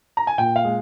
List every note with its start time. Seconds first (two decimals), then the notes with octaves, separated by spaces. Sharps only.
0.17 A#5
0.27 G#5
0.38 A#2 G5
0.56 F5
0.65 G#3